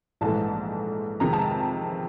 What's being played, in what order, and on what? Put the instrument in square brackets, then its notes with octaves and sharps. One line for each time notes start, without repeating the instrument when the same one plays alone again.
[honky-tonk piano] A#1 G#2 E3 A3 A5
F2 C3 D#3 G#3 A#5
A5